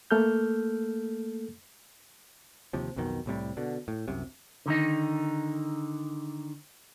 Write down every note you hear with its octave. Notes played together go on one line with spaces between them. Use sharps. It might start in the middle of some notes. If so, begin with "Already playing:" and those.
A3 A#3 A4 F6 G6
D#2 C3 F3
B1 F2 B2 D#3
C2 A2 C3 G3
B2 D3
A2
C2 F#2 C3
D3 D#3 D#4